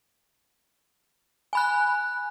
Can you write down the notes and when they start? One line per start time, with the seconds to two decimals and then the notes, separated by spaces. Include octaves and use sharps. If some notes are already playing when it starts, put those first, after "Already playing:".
1.53 G#5 B5 F#6